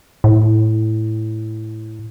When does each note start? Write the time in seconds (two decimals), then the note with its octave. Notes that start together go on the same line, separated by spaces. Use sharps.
0.24 A2